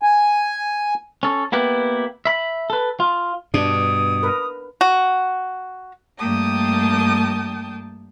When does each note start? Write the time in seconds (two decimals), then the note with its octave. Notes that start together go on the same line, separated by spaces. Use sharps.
0.02 G#5
1.23 C#4 A4
1.52 A#3 B3 E4 G4 B4
2.25 E5 B5
2.70 A4 B4
3.00 F4
3.54 G2 B2 D4 D#6
4.23 A#4 B4
4.81 F#4
6.19 G2 A3 A#3 G5 A5 D#6